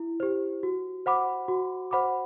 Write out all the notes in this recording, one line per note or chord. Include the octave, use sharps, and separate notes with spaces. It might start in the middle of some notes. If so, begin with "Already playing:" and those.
Already playing: E4
G4 C5
F#4
C5 F#5 B5 D6
F#4
C5 F#5 B5 D6